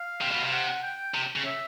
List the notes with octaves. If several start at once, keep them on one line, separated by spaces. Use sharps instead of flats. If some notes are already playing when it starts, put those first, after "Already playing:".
Already playing: F5
C3
B2
C3 F5
F#5
G5
C3
C#3
E5